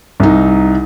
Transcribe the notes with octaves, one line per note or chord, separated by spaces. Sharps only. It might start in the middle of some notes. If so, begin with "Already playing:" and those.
C2 D#4